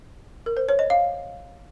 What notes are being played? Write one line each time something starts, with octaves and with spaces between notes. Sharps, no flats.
A#4
C5
C#5
D#5
F5